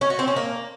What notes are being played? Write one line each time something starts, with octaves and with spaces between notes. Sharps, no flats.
C#4
F#4
C4
C#4
A#3